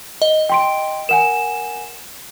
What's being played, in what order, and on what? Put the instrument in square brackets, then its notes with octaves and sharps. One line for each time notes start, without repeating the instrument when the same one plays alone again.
[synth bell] D#5
[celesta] G5 C6 D7
[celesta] A#4 F#5 G#5 [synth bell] E7